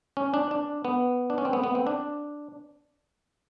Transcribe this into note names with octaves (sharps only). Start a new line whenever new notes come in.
C#4
D4
D4
B3
D4
C#4
C4
B3
B3
C4
D4